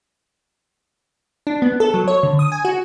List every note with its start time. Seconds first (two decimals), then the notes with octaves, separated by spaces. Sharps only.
1.47 D4
1.62 B3
1.80 A4
1.94 F#3
2.08 C#5
2.23 D3
2.39 D#6
2.52 G#5
2.65 F#4